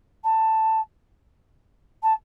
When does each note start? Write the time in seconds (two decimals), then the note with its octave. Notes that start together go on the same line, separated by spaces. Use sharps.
0.24 A5
2.03 A5